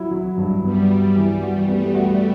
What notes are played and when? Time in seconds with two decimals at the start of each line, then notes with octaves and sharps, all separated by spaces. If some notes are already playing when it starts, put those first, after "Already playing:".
Already playing: F#3 E4
0.11 F#3
0.38 G2
0.65 G3 B3
0.90 F#3
1.16 E3 G3
1.43 F#4
1.69 A3 B3
1.95 F#4